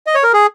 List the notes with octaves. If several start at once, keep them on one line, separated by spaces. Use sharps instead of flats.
D#5
C#5
A#4
G#4